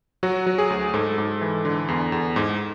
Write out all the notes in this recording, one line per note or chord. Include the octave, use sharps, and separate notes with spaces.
F#3 F#4
F#3
G#4
D2
G#2 A4
G#2
E3
D3
E2
E2
G#2